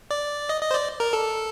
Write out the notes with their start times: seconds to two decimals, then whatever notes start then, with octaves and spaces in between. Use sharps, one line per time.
0.11 D5
0.49 D#5
0.62 D#5
0.71 C5
0.74 D5
1.00 A#4
1.13 A4